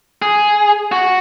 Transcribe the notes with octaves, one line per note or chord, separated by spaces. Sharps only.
G#4
F#4